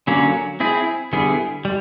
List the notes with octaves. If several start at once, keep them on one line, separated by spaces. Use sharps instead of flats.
D3 F#3 A#3 C#4
C4 E4 G#4
D3 G3 B3 E4 G#4
G3